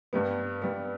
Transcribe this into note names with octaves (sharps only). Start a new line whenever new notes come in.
G2 G3 B3
G2 G3 B3